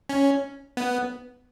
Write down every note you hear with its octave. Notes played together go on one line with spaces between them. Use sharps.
C#4
B3